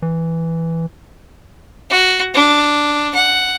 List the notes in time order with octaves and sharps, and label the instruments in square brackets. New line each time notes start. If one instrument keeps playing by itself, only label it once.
[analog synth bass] E3
[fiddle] F#4
D4
F#5